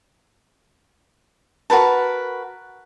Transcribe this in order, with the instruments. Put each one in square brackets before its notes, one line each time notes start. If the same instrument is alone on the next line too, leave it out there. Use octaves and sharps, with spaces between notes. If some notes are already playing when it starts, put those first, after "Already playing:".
[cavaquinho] F#4 A#4 B4 A5